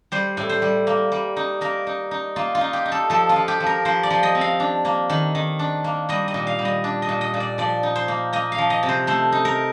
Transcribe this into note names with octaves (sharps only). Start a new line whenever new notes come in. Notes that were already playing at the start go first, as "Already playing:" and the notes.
G3 C5
A2
C5
G3
A#3
G3
D#4
A#3 A#4
D#4
D#4
A#3 F4
F4
D#4
G4
D#4
A4
F3 A4
F4
F3
G4
F3
A#4
F3 C5
D5
F3
D#5
C4
F5
D4
A#3
D#3
D#3
D4
A#3
G3 D#5
D#5
A#2
F5
G3
D#5
D4
D#5
A#2
D#5
A#2
D5
F3 D5
D#4
C5
A#3
A#3 D#5
F5
F3
D#5
C3
C5
A3 C5
D#4
A#4